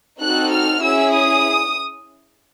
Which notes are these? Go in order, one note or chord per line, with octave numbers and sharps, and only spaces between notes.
C4 D#4 F#4 A4 F#6
F6
C#4 E4 G#4 E6
D#6